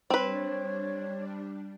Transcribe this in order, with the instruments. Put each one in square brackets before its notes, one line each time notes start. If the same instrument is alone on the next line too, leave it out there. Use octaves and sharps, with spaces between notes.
[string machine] G3 D4 [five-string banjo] C4 B4 [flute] C#5